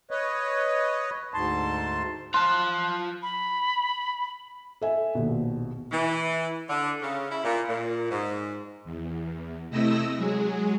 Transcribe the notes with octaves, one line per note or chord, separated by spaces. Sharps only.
B4 C#5 D#5
D2 G#2 A5 C6
F4 A5 C6 F#6
B5
A4 E5 G#5
A#1 D#2 B2
E3
D3
C#3
E4
A#2
A#2
G#2
E2
C3 A3 E4 D#5 E6 A#6
F#3 G#3 G#4